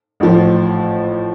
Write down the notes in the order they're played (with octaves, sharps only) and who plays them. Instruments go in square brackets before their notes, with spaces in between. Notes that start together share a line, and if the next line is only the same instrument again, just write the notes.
[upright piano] A1 A2 F3